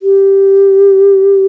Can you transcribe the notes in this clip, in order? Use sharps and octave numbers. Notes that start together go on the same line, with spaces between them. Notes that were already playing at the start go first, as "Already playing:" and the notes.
G4